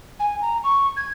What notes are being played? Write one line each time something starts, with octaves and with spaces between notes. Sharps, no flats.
G#5
A#5
C#6
G#6